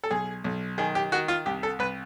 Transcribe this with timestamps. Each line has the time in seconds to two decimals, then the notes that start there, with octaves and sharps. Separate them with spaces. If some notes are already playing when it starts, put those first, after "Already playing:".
0.03 A4
0.11 B1 G#4
0.44 B1
0.78 D#3 G#4
0.95 G4
1.12 D#3 F#4
1.28 F4
1.46 C2 G4
1.63 A4
1.79 C2 B4